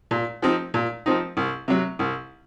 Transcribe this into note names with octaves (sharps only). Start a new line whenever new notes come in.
A#2
F3 C4 D#4
A#2
F3 C4 D#4
C2
C3 F#3
C2